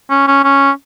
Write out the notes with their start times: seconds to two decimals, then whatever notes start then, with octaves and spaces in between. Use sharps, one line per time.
0.10 C#4
0.27 C#4
0.44 C#4